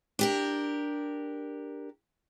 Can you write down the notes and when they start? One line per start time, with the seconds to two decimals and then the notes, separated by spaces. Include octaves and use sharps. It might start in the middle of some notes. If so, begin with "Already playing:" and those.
0.19 D4 G4 A#4